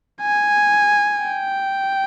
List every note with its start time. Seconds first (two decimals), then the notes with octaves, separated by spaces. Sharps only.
0.22 G#5
1.23 G5